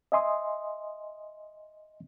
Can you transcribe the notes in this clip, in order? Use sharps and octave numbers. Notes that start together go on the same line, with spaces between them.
D#5 E5 G#5 C6 D#6